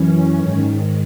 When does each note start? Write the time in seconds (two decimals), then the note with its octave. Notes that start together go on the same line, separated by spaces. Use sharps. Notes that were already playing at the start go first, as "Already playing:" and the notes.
Already playing: F#2 E3 C#4
0.38 G#2 D#3